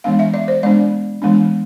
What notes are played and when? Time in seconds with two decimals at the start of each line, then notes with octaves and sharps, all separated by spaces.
0.04 E3 G#3 B3 D4 F5
0.19 E5
0.34 D5
0.48 C5
0.63 G#3 B3 D4 D5
1.22 E3 G#3 B3 D4